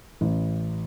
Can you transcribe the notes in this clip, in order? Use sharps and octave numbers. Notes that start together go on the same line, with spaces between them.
A1